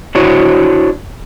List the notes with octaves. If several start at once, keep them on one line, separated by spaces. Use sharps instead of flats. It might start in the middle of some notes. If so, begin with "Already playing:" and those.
D4 E4 F#4 C5 C#5